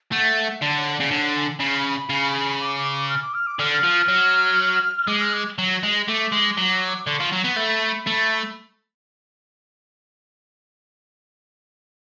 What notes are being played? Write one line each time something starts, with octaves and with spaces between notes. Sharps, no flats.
A3 F#5
D3 D5
C#5
D5
C#3
D3 C#5
G#5
C#3 B5
C#6
B5
C#3
D6
D6
D6
F6
D6
F6
D6
D3 F6
F6
F3
F#3
G#3 D6
F6
D6
F#3
G#3
A3 D6
G#3
F#3
D3 C#6
F3
F#3
B3
A3 B5
A3